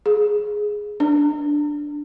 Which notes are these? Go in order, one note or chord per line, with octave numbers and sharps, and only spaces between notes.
G#4
D4